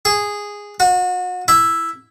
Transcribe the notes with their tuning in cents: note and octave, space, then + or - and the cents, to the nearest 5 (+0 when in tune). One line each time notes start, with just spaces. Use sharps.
G#4 -10
F#4 -35
E4 +0